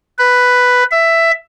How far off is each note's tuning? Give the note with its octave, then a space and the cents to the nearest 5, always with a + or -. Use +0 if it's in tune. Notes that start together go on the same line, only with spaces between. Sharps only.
B4 +5
E5 +10